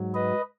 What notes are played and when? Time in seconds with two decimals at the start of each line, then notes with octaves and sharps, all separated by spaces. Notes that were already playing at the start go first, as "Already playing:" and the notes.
Already playing: G#2 F#3
0.14 B4 D#5